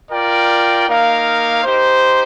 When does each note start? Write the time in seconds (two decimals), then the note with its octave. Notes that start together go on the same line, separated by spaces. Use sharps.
0.10 F4 A#4 D5 G5
0.87 A#3 D#4 A#4 F5
1.64 D#4 G4 C5